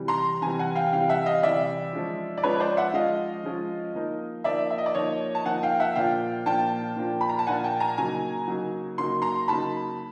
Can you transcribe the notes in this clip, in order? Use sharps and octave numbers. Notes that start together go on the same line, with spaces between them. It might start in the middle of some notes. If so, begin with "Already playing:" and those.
Already playing: C3 E3 G3
A#5 C6
C3 E3 G3 G#5 A#5
F#5 G#5
F5 G5
C3 E3 G3 F5 G5
E5 F#5
D#5 F5
C3 E3 G3 D5 E5
F3 G#3 C#4 F4
D5
F3 G#3 C#4 F4 B4 C#5
C5 D5
E5 F#5
F3 G#3 C#4 F4 D#5 F5
F3 G#3 C#4 F4
F3 A#3 D#4
F3 A#3 D#4 D5 E5
E5
D#5
D5
F3 A#3 D#4 C#5 D#5
A5
F3 A#3 D#4 F#5 G#5
F5 G5
E5 F#5
A#2 F3 A#3 D4 F4 F5 G5
A#2 F3 A#3 D4 F4 G5 A5
A#2 F3 A#3 D4 F4
B5
A#5
A5
A#2 F3 A#3 D4 F4 F#5 G#5
G5 A5
G#5 A#5
C#3 F#3 A#3 D#4 G#5 A#5
C#3 F#3 A#3 D#4
C#3 F#3 A#3 D#4 C6
A#5 C6
C#3 F#3 A#3 D#4 A5 B5